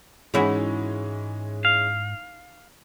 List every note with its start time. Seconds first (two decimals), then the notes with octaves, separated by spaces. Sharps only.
0.34 G#2 E3 G#3 C#4 D#4 E4 F#4
1.65 F5